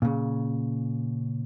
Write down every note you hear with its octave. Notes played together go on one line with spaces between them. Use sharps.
A#2 C#3